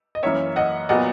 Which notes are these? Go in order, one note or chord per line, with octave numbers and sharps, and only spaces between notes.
D#5
F#2 E3 A#3 C#4 C#5 E5
D#5 F#5
A#2 F#3 B3 D#5 F#5